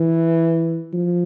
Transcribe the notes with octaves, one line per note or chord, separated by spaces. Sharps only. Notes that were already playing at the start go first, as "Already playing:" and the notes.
Already playing: E3
F3